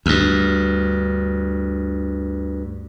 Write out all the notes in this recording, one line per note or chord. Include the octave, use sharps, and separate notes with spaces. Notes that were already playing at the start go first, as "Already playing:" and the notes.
D2 G2